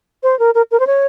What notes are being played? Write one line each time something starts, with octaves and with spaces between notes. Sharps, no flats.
C5
A#4
A#4
A#4
C5
C#5